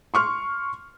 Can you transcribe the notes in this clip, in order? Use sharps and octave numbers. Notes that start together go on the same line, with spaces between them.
C6 C#6 F6